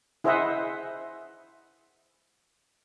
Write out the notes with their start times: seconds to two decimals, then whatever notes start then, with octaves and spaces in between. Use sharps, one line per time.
0.24 E4 G#4 C5 D#5 E5 F#5